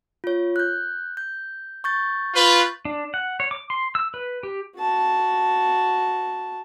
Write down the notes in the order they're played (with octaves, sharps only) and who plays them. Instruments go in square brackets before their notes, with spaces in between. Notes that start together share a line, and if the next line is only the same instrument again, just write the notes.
[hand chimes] F4 C#5
F#6 G6
G6
C#6 G6 A6
[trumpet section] F4 B4
[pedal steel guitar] D4
F#5
C#5
D6
C6
E6
B4
G4
[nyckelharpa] F#4 A5